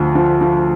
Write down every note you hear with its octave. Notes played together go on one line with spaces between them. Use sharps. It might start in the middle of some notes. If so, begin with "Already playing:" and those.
Already playing: D2 F3
F3
F3